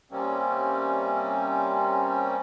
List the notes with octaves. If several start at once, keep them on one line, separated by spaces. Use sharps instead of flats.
C3 G3 A#3 C4 C#4